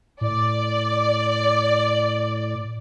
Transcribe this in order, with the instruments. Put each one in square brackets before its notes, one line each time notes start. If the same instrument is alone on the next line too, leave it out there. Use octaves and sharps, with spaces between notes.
[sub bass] A2 [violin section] D5